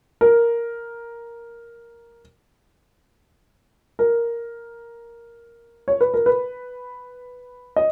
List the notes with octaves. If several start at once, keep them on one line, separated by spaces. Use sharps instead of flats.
A#4
A#4
C#5
B4
A#4
B4
D#5